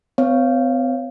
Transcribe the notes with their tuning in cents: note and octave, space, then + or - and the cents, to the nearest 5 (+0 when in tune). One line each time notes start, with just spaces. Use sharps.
C4 -45 C#5 +0 F5 -10